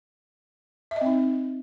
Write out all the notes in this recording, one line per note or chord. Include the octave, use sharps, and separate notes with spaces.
E5
D#5
C4
D#4